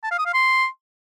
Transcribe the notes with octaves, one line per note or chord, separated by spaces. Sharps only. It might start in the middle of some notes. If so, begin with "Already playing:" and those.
A5
F5
D#6
F5
C6